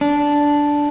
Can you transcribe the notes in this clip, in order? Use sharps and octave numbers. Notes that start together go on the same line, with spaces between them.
D4